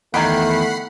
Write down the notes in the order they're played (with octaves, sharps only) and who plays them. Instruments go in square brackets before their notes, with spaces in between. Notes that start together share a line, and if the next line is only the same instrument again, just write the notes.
[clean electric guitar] E2 D#3 [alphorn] A3 [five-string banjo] D#4 G5 [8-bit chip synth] F#5 B5 C7